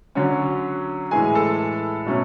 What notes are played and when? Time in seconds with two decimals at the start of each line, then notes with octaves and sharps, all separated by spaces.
0.15 D3 F#3 C#4 C#5
1.11 A2 E3 G#3 G#4 G#5
1.35 A4 A5
2.06 B2 F#3 A3 C#4